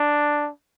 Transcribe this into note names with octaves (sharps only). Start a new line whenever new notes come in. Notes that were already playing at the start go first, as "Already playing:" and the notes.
Already playing: D4